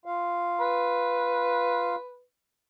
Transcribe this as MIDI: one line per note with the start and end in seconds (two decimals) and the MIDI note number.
0.05 1.95 65
0.05 1.95 77
0.60 2.22 71